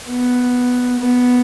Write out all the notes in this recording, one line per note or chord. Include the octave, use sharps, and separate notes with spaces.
B3
B3